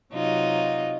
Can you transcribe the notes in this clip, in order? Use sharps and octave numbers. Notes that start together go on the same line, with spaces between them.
C3 F#3 D#4 F4